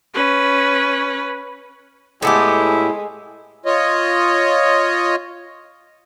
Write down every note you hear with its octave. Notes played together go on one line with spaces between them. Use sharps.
C#4 B4
A2 G#3 B3 E4 G4
F4 C#5 D#5